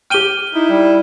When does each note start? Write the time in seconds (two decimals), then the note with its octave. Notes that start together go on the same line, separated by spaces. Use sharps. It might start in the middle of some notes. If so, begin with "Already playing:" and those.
0.10 G4 G5 F6 D#7 G7
0.54 D#4 E4
0.69 G3